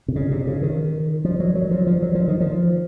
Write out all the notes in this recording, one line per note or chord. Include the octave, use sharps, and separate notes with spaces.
C3
C#3
C3
C#3
D#3
F3
F#3
F#3
F3
F3
F#3
F3
D#3
F3